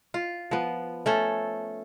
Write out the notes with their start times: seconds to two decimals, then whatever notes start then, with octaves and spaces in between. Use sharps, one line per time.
0.14 F4
0.51 F3 B3
1.06 A3 C#4 A4